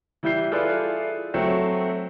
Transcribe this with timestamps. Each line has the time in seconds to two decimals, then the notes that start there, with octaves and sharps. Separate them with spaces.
0.23 E3 G3 E4 G6 C7
0.51 E4 F4 G#4 A4 B4 D5
1.34 F#3 A3 C4 E5